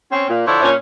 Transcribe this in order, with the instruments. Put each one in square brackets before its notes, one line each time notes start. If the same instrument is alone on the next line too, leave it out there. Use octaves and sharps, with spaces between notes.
[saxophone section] C4 C#4
A#2
[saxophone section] D3 F3 E4 [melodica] D4 C5 C#5
[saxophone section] A#2 C#4